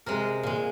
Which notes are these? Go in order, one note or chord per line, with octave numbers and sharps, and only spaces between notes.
C3 G#3 A#4
A#2 G#3